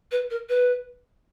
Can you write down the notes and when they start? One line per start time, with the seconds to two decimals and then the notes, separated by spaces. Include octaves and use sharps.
0.11 B4
0.30 A#4
0.49 B4